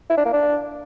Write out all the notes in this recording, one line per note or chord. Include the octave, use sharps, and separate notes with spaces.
E4
D4
A#3
D4